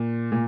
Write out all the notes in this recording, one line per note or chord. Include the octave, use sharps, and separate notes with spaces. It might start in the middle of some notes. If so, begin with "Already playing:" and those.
Already playing: A#2
A#2